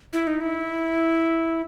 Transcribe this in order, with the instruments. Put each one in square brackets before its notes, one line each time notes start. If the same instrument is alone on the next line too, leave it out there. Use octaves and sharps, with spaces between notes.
[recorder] E4
D#4
E4